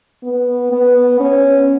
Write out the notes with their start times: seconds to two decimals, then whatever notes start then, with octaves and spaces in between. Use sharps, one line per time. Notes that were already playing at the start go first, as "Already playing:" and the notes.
0.24 B3
0.72 B3
1.20 C#4